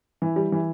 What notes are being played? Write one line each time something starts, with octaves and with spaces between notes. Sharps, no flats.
E3
G3
E3